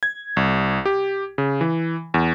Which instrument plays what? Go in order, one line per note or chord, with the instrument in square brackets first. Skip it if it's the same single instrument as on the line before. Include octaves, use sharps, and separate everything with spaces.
[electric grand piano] G#6
C2
G4
C#3
E3
E2